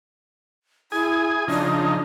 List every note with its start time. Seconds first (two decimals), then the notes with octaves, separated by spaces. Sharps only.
0.92 E4 G#4 G#5
1.48 C#3 F3 D4 D#4